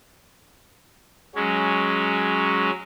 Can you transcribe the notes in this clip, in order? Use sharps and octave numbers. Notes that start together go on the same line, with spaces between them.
F#3 G#3 C#4